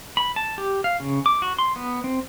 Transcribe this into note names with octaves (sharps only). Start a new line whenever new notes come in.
B5
A5
G4
F5
C#3
D6
F#4
C6
B3
C4